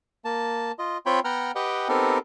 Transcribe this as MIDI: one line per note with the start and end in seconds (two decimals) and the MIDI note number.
0.25 0.72 58
0.25 0.72 81
0.79 0.98 65
0.79 0.98 75
1.06 1.20 60
1.06 1.20 65
1.06 1.20 73
1.06 1.20 79
1.06 1.20 83
1.24 1.52 59
1.24 1.52 78
1.24 1.52 79
1.24 1.52 82
1.24 1.52 89
1.55 1.88 67
1.55 1.88 71
1.55 1.88 75
1.55 1.88 78
1.55 1.88 79
1.89 2.18 59
1.89 2.18 60
1.89 2.18 63
1.89 2.18 67
1.89 2.18 69
1.89 2.18 70